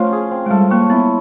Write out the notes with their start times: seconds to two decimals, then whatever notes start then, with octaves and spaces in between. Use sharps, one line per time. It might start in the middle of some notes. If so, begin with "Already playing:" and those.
Already playing: F3 A3 C#4 F4
0.12 G#4
0.31 C4
0.46 G#3
0.51 G3 A4
0.70 A#3 C#5
0.90 B3 E4